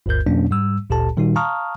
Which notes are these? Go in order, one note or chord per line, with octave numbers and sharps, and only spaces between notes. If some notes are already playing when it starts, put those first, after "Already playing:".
G1 D2 G2 A#4 G6
F2 B2 F#3 A#3 C#4 D4
G#2 G3 E6
G1 D2 A#2 G4 A4 A5
A#2 D#3 G3 D#4 F#4
F5 A5 A#5 C#6 D#6 F6